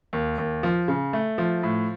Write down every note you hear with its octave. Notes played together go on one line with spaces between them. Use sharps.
D#2
D#2
F3
C#3
A3
F3
A2